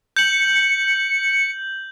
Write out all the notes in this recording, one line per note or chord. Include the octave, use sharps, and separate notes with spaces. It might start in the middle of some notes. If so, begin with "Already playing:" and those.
G6 C#7 F#7